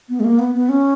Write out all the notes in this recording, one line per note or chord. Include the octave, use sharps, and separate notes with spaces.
B3
G#3
A#3
B3
B3
C#4